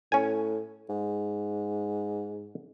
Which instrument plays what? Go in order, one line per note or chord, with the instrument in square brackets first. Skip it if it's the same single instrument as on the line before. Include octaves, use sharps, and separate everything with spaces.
[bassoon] A2 [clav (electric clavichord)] C#4 G#5
[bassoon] G#2